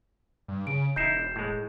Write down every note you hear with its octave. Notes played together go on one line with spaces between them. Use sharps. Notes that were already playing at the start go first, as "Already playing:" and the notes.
G2
C#3 D7
E1 D#4 E4 G6 C7 E7
A2 G#3